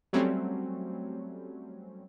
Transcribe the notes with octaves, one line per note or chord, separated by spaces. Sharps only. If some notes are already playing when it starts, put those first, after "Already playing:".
F#3 G3 A3 C4 C#4